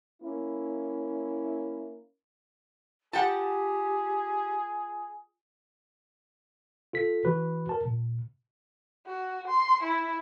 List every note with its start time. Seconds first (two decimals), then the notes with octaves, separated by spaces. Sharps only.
0.22 A#3 C#4 E4
3.13 F4 G4 G#4 F#5 G5 A5
6.93 F4 A4 B6
7.25 E3 F#4 B4
7.69 A#4 A5
7.85 A#2
9.06 F#4
9.47 C6
9.83 E4